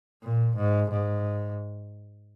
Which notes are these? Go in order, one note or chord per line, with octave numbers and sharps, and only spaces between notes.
A#2
G#2
G#2